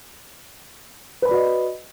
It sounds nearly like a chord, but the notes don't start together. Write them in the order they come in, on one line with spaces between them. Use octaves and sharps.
B4 B5 D5 F#4 D#5